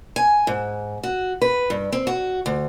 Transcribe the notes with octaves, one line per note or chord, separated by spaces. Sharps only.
G#5
G#2
F#4
B4
G2
C4
F#4
D2